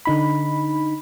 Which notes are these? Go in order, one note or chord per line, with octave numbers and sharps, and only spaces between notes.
D3 D#4 B5